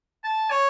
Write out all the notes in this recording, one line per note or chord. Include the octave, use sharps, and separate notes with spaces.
A5
C#5